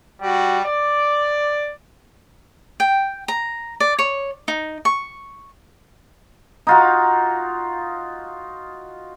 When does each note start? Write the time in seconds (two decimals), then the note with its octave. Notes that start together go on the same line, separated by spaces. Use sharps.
0.21 G3 F#4
0.65 D5
2.80 G5
3.28 A#5
3.80 D5
3.99 C#5
4.48 D#4
4.85 C#6
6.67 D#4 F4 F#4